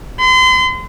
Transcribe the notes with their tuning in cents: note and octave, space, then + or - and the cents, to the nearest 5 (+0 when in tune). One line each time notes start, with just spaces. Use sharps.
C6 -40